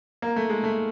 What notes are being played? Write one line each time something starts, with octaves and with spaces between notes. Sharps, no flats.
A#3
A3
G#3
A3